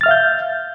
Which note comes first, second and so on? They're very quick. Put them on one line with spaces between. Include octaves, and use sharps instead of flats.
A6 F6 E5 F5 G6